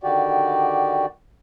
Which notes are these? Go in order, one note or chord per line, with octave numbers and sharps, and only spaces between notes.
D3 D#3 F#4 G4 D5